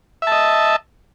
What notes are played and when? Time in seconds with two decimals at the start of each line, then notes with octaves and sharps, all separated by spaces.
0.22 E5
0.27 A5
0.32 D#5